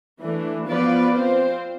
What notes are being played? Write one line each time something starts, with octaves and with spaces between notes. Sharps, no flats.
E3 A3 D4
F3 B3 F4 B4 D5
C4 F4 C5